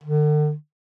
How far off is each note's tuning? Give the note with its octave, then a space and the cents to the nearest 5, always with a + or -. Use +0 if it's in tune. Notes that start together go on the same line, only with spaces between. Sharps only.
D3 +40